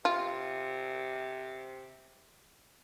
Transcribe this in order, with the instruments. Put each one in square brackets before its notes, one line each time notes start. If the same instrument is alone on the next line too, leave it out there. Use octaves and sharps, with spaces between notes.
[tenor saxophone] C3 [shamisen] F4